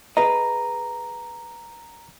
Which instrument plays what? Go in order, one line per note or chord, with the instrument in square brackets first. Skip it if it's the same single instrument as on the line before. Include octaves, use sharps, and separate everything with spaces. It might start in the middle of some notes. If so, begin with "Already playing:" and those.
[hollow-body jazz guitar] G#4 B4 D#5 [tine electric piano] A#5